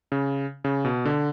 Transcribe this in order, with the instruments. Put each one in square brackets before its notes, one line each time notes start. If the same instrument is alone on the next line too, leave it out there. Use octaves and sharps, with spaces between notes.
[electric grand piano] C#3
C#3
B2
D3